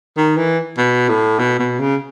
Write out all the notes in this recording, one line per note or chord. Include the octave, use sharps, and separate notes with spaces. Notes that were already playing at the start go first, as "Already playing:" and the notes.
D#3
E3
B2
A2
B2
B2
C#3